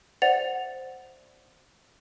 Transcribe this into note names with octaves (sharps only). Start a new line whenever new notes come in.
C5 D5 E5 F#5 A6 F7